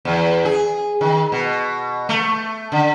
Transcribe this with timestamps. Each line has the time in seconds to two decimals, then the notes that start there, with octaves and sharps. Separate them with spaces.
0.05 E2
0.45 G#4
1.01 D#3
1.32 B2
2.09 A3
2.72 D3